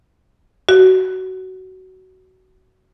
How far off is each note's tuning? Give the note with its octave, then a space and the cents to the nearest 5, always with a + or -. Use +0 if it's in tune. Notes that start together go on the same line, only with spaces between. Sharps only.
F#4 +15